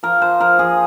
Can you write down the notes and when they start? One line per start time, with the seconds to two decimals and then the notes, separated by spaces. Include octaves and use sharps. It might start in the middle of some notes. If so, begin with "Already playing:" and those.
0.03 F3 A#4
0.21 F3 C5
0.40 F3 A#4
0.59 F3 G#4